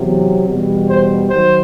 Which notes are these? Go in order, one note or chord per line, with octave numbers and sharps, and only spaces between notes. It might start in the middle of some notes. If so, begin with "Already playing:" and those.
Already playing: E2 C3 F#3
E2 B2 G3
C5
D#3 F#3 C5